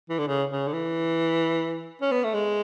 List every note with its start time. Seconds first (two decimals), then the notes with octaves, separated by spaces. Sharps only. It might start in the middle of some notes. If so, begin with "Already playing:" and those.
0.10 E3
0.18 D3
0.27 C#3
0.50 C#3
0.68 D3
0.73 E3
2.02 C#4
2.12 B3
2.24 A3
2.34 G#3